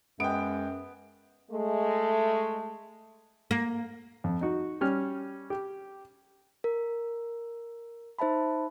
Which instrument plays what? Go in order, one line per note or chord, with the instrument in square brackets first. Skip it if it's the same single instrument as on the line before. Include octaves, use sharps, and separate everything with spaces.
[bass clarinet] F#2 [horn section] G#3 [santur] B3 [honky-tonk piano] G5 D7
[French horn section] G#3 A3
[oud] A#3
[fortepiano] F2
D#4 F#4
G3 C#4 F6
G4
[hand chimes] A#4
D#4 C5 E5 A5 B5